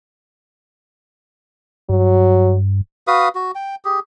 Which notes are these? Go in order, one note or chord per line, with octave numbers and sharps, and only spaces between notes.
G2 F#3
F#4 B4 F5 D#6
F#4
G5
G4 G#4